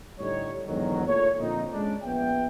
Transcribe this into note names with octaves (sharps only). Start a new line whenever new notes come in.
A2 D3 G3 D#4 C#5
E2 G#2 D3 D#3 F#3
A#2 A3 C#5
A#2 D3 F3 C4 D#4
G#3 C#4 D4
A#1 B3 E5 G5